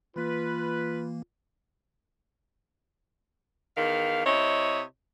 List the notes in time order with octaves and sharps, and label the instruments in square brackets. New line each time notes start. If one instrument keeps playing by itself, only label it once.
[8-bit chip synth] E3 A#3 [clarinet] F4 [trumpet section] B4
[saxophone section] E2 D#3 F5
C3 E4 C#5 D#5